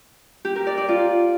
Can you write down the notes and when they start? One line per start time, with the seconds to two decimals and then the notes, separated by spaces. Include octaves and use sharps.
0.45 G4
0.56 A#4
0.67 D5
0.78 D5
0.88 F4